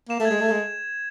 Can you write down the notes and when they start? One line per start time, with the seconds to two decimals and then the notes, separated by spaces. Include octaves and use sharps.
0.09 A#3 E7
0.20 A3
0.25 G#6
0.30 G#3
0.41 A3 G#6
0.51 G#3